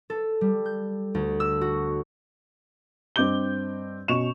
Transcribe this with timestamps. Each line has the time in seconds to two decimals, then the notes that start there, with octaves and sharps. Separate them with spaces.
0.10 A4
0.41 G3
0.66 G6
1.15 D2
1.40 E6
1.61 F#4
3.16 G2 C4 D#5 D6 G6 G7
4.08 B2 C#4 D#5 C#6 E7 F7